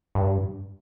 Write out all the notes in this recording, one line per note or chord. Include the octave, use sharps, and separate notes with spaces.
G2